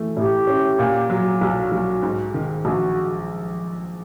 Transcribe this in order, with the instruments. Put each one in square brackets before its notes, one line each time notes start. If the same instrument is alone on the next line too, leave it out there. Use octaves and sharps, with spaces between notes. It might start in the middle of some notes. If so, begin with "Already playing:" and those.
Already playing: [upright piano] E3 A3
[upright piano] A2 [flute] G4
[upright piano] C#4
A#2
F#3
[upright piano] B1 [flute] F#4
[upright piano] B1
G#2
D#3
[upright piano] A#1 [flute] F#4